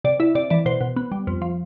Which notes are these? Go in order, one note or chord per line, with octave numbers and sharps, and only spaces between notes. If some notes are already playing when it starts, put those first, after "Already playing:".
C3 D5
E4 E5
C3 D5
E3 D5
B2 C5
B2
B3
G3
F2
F3